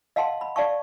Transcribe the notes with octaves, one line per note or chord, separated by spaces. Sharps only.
D#5 F5 F#5 A5 C6
B5
D5 F5 A5 C#6